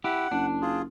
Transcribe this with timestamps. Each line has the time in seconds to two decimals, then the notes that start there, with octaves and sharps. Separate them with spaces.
0.04 E4 G4 F#5
0.31 F#1 D4
0.62 F4 G#4